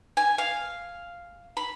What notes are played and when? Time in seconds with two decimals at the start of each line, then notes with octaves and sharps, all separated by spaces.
0.17 G#5
0.38 F5
1.57 B5